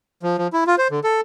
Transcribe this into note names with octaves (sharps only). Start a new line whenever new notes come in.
F3
F3
E4
F4
C5
D3
A4